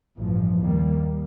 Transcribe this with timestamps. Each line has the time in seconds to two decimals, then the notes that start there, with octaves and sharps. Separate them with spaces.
0.18 A1 G2 F3
0.60 D#2 D#3 G3 A#3